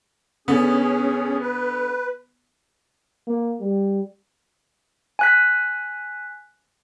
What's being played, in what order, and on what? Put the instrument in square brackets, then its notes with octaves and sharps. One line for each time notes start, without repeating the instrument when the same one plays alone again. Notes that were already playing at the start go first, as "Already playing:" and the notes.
[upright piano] D3 B3 [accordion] C#4 G#4
[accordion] B4
[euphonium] A#3
G3
[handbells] G#5 F#6 B6